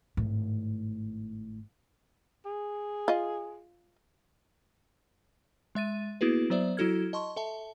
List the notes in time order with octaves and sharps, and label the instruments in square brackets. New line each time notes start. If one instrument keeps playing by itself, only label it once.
[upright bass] G#1 A2
[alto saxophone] G#4
[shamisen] F4 D#5
[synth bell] G#3 E5 A6 D#7
A#3 B3 E4 F#4 G#4 B4
F#3 B3 C5 D5 E5
F#3 E4 F#4 A4 F6 G#6
D#5 A5 C6 C#6
A4 E5 A5